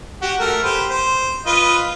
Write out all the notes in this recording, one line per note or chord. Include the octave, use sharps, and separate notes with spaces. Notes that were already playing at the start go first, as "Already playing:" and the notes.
F#4 G4
A3 A#4
G4 B4 C5
C5
F4 B4 D#5